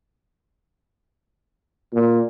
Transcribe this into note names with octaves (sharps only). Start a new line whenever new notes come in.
A#2